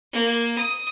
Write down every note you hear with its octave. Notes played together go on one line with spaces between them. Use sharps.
A#3
D#6